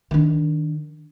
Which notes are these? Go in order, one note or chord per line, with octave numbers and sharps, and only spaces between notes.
D#3 D4